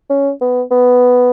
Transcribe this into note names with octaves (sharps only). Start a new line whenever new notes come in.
C#4
B3
B3